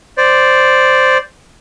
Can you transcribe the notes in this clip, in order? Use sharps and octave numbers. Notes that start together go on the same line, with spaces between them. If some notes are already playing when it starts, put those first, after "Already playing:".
C5 D5